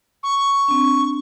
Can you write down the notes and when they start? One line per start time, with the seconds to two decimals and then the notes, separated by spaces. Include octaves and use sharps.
0.23 C#6
0.68 C4 D4